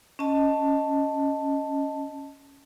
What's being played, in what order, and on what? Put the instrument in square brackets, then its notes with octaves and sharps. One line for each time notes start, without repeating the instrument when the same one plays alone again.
[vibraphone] C#4 D#5 A5